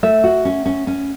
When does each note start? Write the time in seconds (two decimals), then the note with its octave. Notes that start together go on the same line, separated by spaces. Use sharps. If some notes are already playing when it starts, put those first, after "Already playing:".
0.03 A3 E5
0.24 F#4
0.45 C#4
0.66 C#4
0.87 C#4